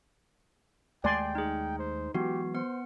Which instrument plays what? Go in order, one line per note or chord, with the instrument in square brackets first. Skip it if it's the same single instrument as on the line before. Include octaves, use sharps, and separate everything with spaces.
[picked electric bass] D#2 G#3 A3 [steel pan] D5 G#5 C6 [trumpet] G5
[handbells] D#4 G#4
[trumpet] C5
[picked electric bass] E3 F#3 G#3 [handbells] B3 F#4 [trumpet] G4
[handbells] B3 F#5 [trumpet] C5